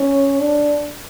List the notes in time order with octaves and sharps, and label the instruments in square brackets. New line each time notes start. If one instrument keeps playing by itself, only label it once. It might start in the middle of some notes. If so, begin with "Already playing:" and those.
Already playing: [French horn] C#4
D4